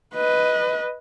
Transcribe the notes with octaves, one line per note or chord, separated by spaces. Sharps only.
B4 D#5